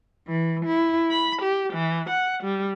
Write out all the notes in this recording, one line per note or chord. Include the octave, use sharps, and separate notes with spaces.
E3
E4
B5
G4
E3
F#5
G3